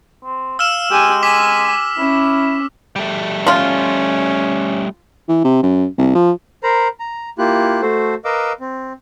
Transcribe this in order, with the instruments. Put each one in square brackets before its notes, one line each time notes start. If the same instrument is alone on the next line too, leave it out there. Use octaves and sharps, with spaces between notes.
[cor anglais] C4
[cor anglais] F5 [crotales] E6 F6 E7
[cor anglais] G#3 [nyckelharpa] G4 G#5
[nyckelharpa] G#5 [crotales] D6 B6
[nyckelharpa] C#4 [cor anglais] E4
[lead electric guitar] G3 A3
[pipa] F3 F4 [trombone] C#4
[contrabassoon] E3
C3
F#2
C2
F3
[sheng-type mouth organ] A#4 C5 A#5 B5
A#5
A#3 E4 F4 G4 F#6
A3 F#4 A4 C5
A#4 B4 D#5 F5 D6 E6
C4